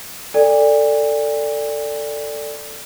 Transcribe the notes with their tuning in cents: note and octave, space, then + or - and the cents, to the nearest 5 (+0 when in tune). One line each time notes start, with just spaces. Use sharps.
A4 +15 D5 +0 G#5 -45